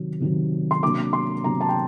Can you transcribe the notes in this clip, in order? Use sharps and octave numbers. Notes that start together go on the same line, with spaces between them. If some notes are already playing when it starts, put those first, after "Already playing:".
Already playing: C3 D#3 F#3
C3 D#3 F#3
C6
C3 F#3 A#3 D4 D6
C6
C3 F#3 A#3 D4 A#5
A5
G5